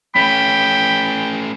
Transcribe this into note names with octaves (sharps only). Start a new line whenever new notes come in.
A3 C#4 G5 B5